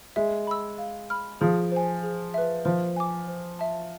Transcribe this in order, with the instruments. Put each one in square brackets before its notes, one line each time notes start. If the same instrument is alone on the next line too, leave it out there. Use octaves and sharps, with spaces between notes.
[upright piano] G#3 [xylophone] E5
[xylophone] B5 E6
F5
B5 F6
[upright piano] F3 [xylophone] G#4
[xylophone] C5 G#5
G#4
B4 E5
[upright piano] F3 [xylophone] C5
[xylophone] G#5 D6
C5
E5 A5